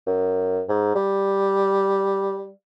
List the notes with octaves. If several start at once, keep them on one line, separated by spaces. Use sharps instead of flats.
F#2
G#2
G3